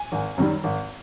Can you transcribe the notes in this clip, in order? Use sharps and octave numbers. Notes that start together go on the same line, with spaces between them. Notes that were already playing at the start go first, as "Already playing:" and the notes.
Already playing: G#5
G#1
F#2 D#3 G3
G#1